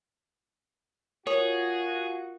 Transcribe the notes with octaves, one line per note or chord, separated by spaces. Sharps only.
F4 F#4 G#4 A#4 C#5